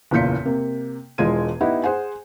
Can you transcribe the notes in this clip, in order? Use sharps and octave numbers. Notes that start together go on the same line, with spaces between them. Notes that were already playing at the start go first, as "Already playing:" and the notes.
F#1 E2 A#2 G6 B6 C#7
C3 A#3
E1 E2 G#3 F4 G#6 D#7
B3 D#4 E4 G4 E5 F#5
G#4 C5 F#5 G#5